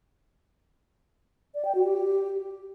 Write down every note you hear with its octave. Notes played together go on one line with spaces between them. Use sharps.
D5
G5
F#4
G4